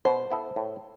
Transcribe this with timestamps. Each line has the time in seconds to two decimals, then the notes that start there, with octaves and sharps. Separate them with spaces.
0.05 B2 C5
0.31 B3 E4 A4
0.56 A2